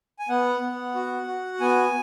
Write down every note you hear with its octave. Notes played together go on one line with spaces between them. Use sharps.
G#5
B3 F#5
B3
F#4
F#4
B3 G#5